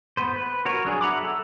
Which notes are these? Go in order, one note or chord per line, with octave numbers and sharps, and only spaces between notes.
B3 B4 C5
B4
F#4 A#4 C#5
F#3 D4 G#4
E5 F#5 A#5 B5 D6
A4